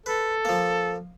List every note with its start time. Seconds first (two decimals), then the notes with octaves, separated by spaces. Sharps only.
0.06 A4 B4
0.45 F3 A#3